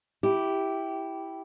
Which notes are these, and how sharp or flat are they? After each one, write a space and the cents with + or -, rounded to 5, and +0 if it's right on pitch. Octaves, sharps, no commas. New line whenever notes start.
E4 -5 G4 -5